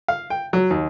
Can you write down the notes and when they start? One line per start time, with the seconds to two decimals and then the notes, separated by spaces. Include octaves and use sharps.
0.08 F5
0.30 G5
0.53 F#3
0.70 D#2